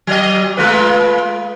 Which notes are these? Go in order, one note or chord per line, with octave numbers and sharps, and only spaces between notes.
F#3 D#5
G#3 F4 B4